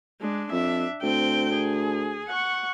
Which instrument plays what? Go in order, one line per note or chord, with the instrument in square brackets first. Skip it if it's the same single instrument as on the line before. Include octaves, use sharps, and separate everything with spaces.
[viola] G#3 D4
[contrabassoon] F2 [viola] D4 E5
[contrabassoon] D2 [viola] C4 G5
[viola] G#4
F#5 C#6